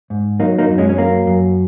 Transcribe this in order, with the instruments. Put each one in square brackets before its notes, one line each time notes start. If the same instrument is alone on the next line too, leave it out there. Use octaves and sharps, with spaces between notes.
[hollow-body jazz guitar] G#2
F#3 A#3 D#4
A#3 D#4
F#2
G#3 C#4
C#4
F#3 A#3
F#2